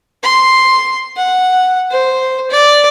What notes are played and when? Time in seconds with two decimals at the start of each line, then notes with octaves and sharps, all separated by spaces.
0.23 C6
1.17 F#5
1.91 C5
2.51 D5